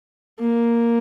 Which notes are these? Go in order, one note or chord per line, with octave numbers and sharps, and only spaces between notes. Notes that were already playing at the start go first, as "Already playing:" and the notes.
A#3